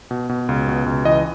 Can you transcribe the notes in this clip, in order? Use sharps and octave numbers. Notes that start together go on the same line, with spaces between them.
B2
B2
C#2
B2
C#2
E3 D#5